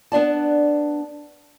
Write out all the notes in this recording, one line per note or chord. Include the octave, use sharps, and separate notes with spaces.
B3 D4 D5 A5